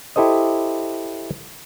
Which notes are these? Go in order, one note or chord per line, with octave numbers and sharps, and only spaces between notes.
E4 G4 A4 C5 D#5